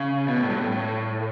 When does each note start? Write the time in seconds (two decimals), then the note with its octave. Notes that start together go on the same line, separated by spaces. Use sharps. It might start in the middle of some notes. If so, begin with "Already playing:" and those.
Already playing: C#3
0.28 B2
0.39 A2
0.50 G2
0.61 A2
0.72 A2